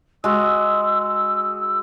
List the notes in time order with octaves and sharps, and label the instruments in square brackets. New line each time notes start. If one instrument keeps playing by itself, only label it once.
[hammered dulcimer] G#3 F#4 [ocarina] E6